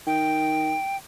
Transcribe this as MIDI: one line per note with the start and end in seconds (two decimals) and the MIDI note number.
0.07 0.75 51
0.07 0.97 79